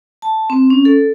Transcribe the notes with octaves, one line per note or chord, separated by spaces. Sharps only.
A5
C4
C#4
A4